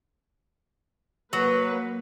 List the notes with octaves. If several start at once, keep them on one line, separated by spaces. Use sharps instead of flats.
F#3 A#3 B4